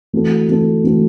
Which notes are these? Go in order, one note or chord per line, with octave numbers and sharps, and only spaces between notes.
E3 A3 C4 F#4 A4
E3 A3 C4 F#4 A4
E3 A3 C4 F#4 A4